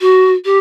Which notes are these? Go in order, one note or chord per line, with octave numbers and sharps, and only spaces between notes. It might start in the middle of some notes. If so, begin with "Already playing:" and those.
F#4
G4